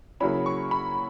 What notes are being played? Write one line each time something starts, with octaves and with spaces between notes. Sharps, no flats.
C#3 F#3 A#3 C#4 E4 B5
C#6
B5